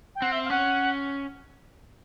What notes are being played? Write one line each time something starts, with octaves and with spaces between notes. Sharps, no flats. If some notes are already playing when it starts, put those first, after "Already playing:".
G5
C4 F#5
E5
F5
C#4 F#5